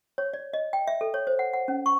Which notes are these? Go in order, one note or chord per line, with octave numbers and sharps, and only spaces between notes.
C#5
D5
D#5
G5
E5
A4
C#5
C5
F#5
F#5
C#4
C#6